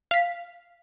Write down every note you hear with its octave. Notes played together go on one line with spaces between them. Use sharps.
F5 B6